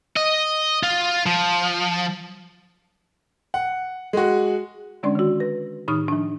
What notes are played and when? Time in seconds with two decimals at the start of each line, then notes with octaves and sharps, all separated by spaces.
0.17 D#5
0.83 F4
1.26 F3
3.54 F#5
4.13 G#3 F#4
5.03 D3 G#3 C#4 D4 D5 C6
5.15 D#3 F#4
5.40 B4
5.88 A2 D#3 D#4 C#6 D#6 F6
6.08 F3 D4